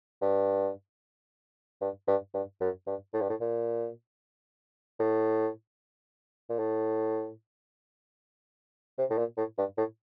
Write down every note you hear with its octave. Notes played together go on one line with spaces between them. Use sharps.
G2
G2
G2
G2
F#2
G2
A2
G2
A2
A#2
A2
A#2
A2
C3
A2
A#2
A2
G2
A2